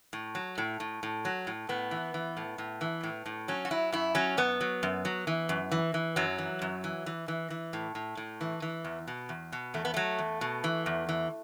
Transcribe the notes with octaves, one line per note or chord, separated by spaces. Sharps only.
A2
F#3
A2
A2
A2
F#3
A2
A2 B3
E3
E3
A2
A2
E3
A2
A2
F#3 C#4
F#4
F#3 E4
F#2 E4
F#3 C#4
F#2 B3
F#3
F#2
F#3
E3
F#2
E3
E3
F#2 F#3
E3
F#2
E3
E3
E3
E3
A2
A2
A2
E3
E3
E2
B2
E2
B2
E2 A3
B3
F#3 A3
E2
B2
E3
E2
E3